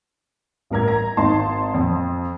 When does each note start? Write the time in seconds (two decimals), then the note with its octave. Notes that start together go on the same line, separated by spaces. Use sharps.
0.70 A1 G2 A#4 A#5 G#6
0.88 A#5
1.17 G#1 D#4 A5 C6
1.74 F2